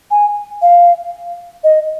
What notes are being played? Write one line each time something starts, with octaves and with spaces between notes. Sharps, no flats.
G#5
F5
D#5